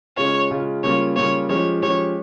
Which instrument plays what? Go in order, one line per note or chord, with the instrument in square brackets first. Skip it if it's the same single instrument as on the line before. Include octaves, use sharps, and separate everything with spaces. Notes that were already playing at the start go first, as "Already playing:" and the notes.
[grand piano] C#3 G#3 C#4 F4 [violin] C#5
[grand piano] C#3 G#3 C#4 F4
[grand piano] C#3 G3 A#3 F4 [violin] C#5
[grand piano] C#3 G3 A#3 F4 [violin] C#5
[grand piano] F3 G#3 C#4 G4 [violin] C#5
[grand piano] F3 G#3 C#4 G4 [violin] C#5